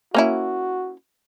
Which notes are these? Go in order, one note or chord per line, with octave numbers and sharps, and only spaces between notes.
A#3 C#4 E4 F#4